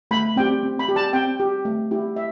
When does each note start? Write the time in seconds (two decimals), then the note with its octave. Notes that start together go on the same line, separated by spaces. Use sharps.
0.11 A3 B5
0.36 C4 G4 G5
0.63 C4
0.79 B5
0.89 G4
0.96 A5
1.13 C4 G5
1.40 G4
1.65 A3
1.91 E4 G4
2.16 E5